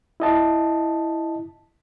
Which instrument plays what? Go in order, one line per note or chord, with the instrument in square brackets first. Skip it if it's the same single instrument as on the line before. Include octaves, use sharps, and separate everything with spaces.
[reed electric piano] E4 D#5 A5